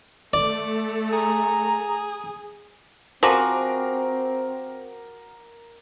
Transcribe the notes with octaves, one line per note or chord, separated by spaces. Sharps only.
A3 D5
G#4 A#5
F3 C4 F#4 G#4 A#4 D6